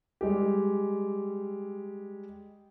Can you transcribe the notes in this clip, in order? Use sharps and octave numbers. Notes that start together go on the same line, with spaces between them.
G3 G#3 G4